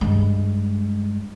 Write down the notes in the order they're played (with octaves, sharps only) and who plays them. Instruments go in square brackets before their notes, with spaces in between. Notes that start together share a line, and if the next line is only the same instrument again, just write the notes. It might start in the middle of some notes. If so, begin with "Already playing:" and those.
[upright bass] G2 G#3